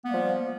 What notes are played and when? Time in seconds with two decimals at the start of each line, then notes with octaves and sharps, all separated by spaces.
0.04 B3
0.08 A#3
0.11 G3
0.14 F3